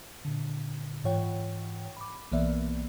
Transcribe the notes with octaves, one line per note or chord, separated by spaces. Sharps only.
A#2 D3
G#2 E3 F4 C#5 F#5 G5
B5 D6
B1 E3 A#3 B3 D5 E5